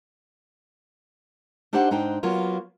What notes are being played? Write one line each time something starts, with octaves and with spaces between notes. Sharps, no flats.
A3 D4 D#4 G4 C5 F#5
G#2 D4 D#4 C5 G5
F#3 A#3 B3 F4